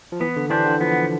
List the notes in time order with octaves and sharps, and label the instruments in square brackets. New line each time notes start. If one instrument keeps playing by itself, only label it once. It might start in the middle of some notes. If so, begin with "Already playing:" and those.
[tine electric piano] F3
[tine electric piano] E3 [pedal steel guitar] B3
[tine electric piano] D3
[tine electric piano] E3 [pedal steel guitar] D4 G4 C5
[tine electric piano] D3
[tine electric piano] F3 [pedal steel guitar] B3